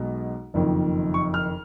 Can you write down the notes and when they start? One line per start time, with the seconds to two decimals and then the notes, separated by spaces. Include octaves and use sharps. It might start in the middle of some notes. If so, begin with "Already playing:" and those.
Already playing: B1 B2 G#3
0.54 F#1 F2 D#3
1.14 C#6
1.34 F6